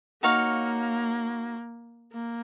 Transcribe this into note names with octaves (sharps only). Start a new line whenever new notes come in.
A#3 D#4 F#4 C#5 F5
A#3